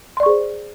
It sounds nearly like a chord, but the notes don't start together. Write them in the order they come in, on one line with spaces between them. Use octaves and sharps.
C6 D5 C#6 G#4 C5